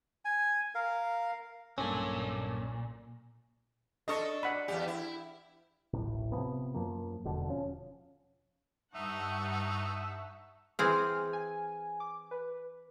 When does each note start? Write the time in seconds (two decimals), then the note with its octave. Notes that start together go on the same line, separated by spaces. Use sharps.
0.25 G#5
0.75 A#4 F5
1.78 B1 G2 A#2 A#3 C#4 A4
4.08 D4 A4 D#5 C#6
4.43 D5 F#5 B5
4.68 E2 A#2 G4
4.88 E4
5.93 D1 A1 A2
6.32 C3 D#3 F3 B3
6.74 F#2 F3 A#3
7.24 D#1 E2 B2 D3
7.48 F3 C#4
8.95 G2 D#4 E5 F#5 A5 C#6
10.79 E3 C4 G#4 F6
11.33 G#5
12.00 D6
12.31 B4